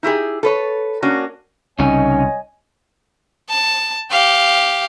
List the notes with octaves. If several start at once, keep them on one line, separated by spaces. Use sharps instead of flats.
D#4 E4 G4 G#4
A4 B4 C#5
A#3 C#4 D4 F#4
C2 C#3 C#4 D#4 C#5 D#5 G#5
A5
G4 F5